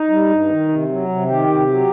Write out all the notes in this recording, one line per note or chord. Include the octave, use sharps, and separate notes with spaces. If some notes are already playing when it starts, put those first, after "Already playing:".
Already playing: D#4
G3
G2
D#3
C3
F#3
C3
D#3 G4
C3
F#3